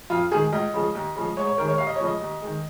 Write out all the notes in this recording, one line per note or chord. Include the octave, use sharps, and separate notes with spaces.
F2 F4
D#3 G#3 G#4
C#2 D#5
C#3 F3 G#3
D#2
C#3 F3 G#3
G#2 C#5
C#5
D#3 G#3 A#4
C#5
D#2 F5
D#5
C#5
C#3 F3 G#3 D#5
D#2
D#3 G#3